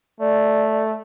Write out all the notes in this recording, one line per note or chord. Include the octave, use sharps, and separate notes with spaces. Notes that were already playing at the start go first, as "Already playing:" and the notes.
A3 D5